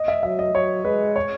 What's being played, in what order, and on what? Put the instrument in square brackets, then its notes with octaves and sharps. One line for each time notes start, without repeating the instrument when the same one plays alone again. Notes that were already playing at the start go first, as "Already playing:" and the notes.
Already playing: [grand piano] D#5
E5
[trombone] F#3 [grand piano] E5
[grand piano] D#5
[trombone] F#3 [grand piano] C#5
[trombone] G#3 [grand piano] B4
[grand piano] C#5